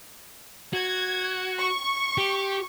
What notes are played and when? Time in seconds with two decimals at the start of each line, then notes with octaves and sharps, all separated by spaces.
0.74 F#4 G#6
1.59 C#6
2.18 G4